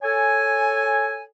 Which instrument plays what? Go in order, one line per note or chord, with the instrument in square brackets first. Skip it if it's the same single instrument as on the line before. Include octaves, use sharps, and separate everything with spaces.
[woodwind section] A4 C#5 G#5